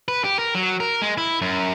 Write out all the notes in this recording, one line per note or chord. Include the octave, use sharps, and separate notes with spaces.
B4
G4
A#4
F#3
A#4
G#3
E4
F#2